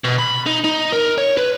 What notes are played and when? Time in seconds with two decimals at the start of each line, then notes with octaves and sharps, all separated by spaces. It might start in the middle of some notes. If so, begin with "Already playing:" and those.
0.04 B2
0.19 B5
0.46 D#4
0.64 D#4
0.92 A#4
1.18 C#5
1.37 B4